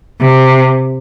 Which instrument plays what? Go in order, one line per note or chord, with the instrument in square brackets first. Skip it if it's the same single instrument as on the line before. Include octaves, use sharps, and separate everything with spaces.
[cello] C3